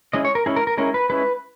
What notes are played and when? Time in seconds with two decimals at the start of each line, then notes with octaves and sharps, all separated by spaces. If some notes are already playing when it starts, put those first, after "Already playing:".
0.13 G#3 C#4 E4 D#5
0.25 C#5
0.35 A#4
0.46 G#3 C#4 E4 G#4
0.56 A#4
0.67 A#4
0.78 G#3 C#4 E4 A#4
0.94 B4
1.10 G#3 C#4 E4 B4